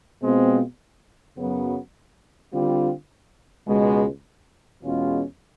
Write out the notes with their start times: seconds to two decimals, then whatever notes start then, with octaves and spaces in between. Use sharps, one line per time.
0.20 B2 G#3 C4 F4
1.36 F#2 C#3 F#3 B3
2.52 D3 G3 C4 F4
3.66 C#2 B2 G#3
4.82 E2 B2 G#3 C#4 F4